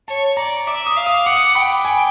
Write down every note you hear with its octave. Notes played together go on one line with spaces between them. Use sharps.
C#5 A5
D5 A#5
E5 D6
D#6
F5
D#6
F#5 D6
G5 B5
G#5